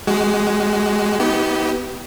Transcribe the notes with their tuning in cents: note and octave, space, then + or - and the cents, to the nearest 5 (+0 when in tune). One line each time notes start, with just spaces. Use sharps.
G#3 +0 F#4 +30
B3 +5 D#4 +35 G4 -20